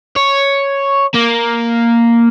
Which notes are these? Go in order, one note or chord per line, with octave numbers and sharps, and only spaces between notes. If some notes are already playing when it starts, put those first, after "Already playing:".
C#5
A#3